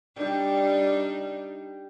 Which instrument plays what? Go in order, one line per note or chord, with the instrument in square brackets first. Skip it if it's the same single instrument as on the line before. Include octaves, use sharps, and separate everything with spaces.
[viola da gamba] G3 D4 D#4 [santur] G4 G5